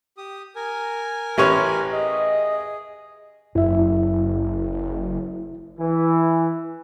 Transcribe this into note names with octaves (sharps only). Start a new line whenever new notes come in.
G4 D#6
A#4 G#5
A1 C#4 G4 B4 C#5 C6
G#4 D#5
F#1 F#2 E4 E5
E3